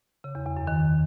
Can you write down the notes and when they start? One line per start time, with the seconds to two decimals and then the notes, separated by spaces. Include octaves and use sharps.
0.24 C#3
0.35 E2
0.46 E2
0.57 F#2
0.67 D#3